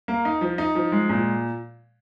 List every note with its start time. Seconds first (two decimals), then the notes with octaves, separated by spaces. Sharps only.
0.08 A#3
0.25 D#4
0.41 F3
0.58 D#4
0.75 F3
0.92 G#3
1.09 A#2